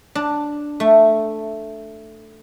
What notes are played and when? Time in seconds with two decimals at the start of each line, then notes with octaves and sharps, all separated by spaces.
0.15 D4
0.80 A3